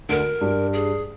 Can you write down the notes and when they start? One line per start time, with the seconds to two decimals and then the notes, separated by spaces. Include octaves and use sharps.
0.09 D2 D3 A#4
0.41 G2 G3
0.73 G#4